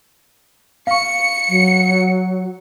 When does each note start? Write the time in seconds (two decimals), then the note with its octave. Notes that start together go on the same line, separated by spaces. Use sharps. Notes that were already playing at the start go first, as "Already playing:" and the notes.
0.87 F5 C#6 C#7
1.49 F#3